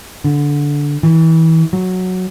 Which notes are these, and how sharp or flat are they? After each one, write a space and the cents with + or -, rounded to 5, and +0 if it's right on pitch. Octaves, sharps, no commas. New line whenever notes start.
D3 -15
E3 -30
F#3 -5